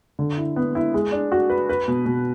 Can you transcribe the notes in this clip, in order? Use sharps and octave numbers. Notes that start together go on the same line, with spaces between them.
D3
E4
B3
E4
G#3
D4
F#4
B4
B4
B2
B2